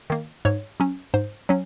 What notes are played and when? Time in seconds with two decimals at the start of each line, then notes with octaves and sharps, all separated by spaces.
0.10 D#3 A#3
0.45 G#2 C#5
0.80 F#3 C#4
1.14 G#2 C5
1.49 F#3 C#4